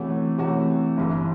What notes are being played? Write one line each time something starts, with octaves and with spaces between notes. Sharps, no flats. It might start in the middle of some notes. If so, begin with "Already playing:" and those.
Already playing: C3 E3 A3 C#4 F#4
C3 E3 A3 C#4 F#4
G1 G2 E3